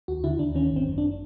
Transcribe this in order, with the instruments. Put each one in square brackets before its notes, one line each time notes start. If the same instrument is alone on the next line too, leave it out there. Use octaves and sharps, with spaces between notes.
[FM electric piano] D#2 F#4
D3 E4
D#2 D4
D#3 C#4
G#1
C4
F#2
D4